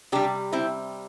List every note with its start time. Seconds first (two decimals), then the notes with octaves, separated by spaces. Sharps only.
0.12 C3 G3 D4 G4
0.52 C4 E4